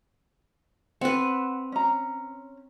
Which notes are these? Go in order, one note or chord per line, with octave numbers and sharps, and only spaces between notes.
C4 B4 F#5
C#4 A#5